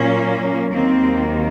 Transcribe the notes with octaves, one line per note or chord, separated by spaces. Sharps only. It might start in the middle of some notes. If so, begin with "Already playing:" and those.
Already playing: A#2 F#3 A#3 C#4
D#2 D#3 F#3 A#3 C4